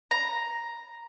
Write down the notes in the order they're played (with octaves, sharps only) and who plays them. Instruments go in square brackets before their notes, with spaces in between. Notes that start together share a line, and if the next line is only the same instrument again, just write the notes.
[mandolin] A#5